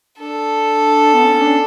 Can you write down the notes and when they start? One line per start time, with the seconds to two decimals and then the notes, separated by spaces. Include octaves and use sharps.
0.19 D4 A4
1.14 B3
1.24 C#4
1.41 D4